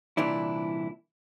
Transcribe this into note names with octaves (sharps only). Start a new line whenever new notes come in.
C2 A#2 E3 D4 E4